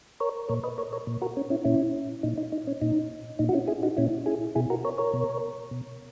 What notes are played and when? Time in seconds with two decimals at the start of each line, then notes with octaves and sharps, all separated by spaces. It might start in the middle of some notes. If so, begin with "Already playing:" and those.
0.20 A#4 C#5
0.49 A#2 A#4 C#5
0.64 B4 D#5
0.78 A#4 C#5
0.93 A#4 C#5
1.07 A#2
1.22 F#4 A#4
1.37 C#4
1.50 C#4 E4
1.65 A#2 C#4 E4
2.23 A#2 D#4
2.38 D#4
2.52 D#4
2.67 C#4
2.81 A#2 D#4
3.39 A#2 D#4
3.49 F#4
3.53 C#4 E4
3.68 E4 G#4
3.83 D#4 F#4
3.97 A#2 C#4 E4
4.26 E4 G#4
4.55 B2 E4 G#4
4.70 F#4 A#4
4.84 A#4 C#5
4.98 A#4 C#5
5.13 B2
5.71 B2